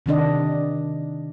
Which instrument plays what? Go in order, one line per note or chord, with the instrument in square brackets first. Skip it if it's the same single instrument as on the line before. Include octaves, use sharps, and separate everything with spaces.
[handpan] C3 D#3 D4 D#5